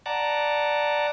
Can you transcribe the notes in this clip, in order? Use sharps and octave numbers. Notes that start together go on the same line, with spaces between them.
D5 F#5 A5 A#5